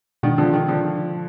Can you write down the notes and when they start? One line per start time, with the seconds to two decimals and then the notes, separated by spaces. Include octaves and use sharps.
0.23 B2 D#3 G#3 D4
0.38 D3 F3
0.53 D#3
0.69 D3 F3